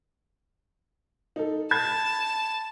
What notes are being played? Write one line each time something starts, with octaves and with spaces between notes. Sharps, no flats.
D#4 A4
A5 B5 G#6